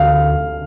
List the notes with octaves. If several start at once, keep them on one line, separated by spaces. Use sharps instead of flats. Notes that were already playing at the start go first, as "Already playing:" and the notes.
Already playing: D2 F5